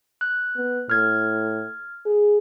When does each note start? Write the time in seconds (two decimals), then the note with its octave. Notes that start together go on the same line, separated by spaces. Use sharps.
0.21 F#6
0.56 B3
0.90 A2 F6 G#6
2.06 G#4